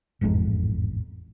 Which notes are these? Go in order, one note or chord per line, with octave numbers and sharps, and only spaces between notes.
E1 A1 F2 G#2